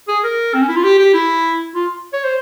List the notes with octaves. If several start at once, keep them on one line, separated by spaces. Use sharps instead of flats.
G#4
A#4
C4
C#4
E4
F4
G4
G4
E4
F4
C#5
C5